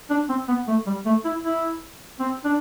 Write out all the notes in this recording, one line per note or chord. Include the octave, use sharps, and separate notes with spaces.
D4
C4
B3
A3
G3
A3
E4
E4
C4
D4